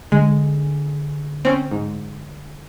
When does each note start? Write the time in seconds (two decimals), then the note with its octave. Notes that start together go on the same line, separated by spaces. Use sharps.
0.12 D3 G#3 G#4
1.45 C4 C#4
1.71 G#2